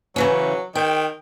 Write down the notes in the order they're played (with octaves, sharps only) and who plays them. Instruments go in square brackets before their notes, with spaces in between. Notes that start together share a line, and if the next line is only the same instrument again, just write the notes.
[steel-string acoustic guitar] C#3 E3 C#4 [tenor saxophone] F#3
[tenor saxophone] D#3 [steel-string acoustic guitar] G5